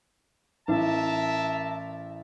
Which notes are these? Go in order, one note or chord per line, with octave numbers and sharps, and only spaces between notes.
A1 A#4 E5 A5